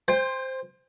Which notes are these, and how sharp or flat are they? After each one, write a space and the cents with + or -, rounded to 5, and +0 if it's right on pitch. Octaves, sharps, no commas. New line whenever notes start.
C5 +0 G5 +40